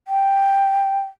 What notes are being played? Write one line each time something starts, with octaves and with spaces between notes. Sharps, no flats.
G5